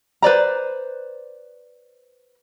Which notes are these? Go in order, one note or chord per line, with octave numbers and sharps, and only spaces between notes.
B4 C5 D5 A#5